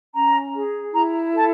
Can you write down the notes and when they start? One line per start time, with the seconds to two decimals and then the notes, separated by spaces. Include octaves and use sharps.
0.14 C#4 A#5
0.54 G#4
0.93 E4 A#5
1.33 A4 A5